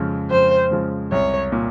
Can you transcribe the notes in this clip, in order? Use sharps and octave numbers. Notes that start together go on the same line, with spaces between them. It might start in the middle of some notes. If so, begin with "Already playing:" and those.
Already playing: F2 C#3 F3 G#3
F2 C5
C#3 F3 G#3
C2 C#5
A#2